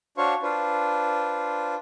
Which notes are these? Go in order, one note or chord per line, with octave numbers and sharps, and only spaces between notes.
D4 F#4 C5 C#5 F5 C#6
D4 F4 B4 C5